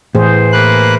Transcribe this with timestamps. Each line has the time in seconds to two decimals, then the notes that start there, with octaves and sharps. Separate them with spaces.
0.15 A2 E3 G#4 C5
0.52 A#3 B4 F#6